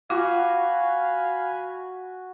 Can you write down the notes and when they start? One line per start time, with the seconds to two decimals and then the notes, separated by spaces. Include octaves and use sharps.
0.10 F4 F#4 F5 G#5 B5